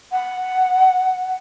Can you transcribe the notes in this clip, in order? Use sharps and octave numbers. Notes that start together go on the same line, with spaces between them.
F#5